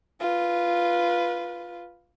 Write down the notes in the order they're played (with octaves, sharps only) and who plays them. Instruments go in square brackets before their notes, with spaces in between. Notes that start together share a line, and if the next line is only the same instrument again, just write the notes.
[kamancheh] F4 B4